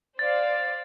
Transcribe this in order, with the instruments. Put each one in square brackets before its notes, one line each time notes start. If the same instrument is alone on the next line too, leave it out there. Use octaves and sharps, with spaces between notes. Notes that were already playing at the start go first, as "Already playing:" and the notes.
[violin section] C5 D5 F5 [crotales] A6